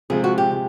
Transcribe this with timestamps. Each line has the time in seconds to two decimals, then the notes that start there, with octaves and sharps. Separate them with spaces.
0.10 C3 F3 G#3 G#4
0.24 F#4
0.38 G4
0.51 C3 F3 G#3